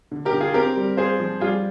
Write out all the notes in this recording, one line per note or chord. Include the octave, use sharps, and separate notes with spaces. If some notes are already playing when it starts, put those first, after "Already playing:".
D3
G4 A#4
D3
F4 G#4
C4 G4 A#4
G3
F4 G#4 C5
F3
G3 F4 G#4